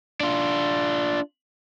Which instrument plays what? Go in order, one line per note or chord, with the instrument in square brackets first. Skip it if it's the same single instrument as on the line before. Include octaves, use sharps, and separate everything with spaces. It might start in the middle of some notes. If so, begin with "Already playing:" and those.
[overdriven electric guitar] D4 F4